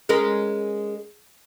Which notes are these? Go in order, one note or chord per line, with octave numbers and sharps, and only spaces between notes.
G#3 C#4 A#4